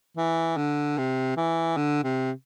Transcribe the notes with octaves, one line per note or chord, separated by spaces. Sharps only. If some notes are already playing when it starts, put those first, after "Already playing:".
E3
D3
C3
E3
D3
C3